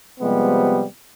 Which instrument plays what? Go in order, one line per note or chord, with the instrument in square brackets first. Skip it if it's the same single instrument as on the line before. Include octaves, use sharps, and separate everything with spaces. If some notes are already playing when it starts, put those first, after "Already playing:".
[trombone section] C3 F3 G3 G#3 B3